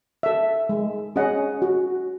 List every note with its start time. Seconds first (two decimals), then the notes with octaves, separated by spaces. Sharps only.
0.23 A4 E5
0.69 G#3
1.16 C#4 G#4 D#5 F#5
1.62 F#4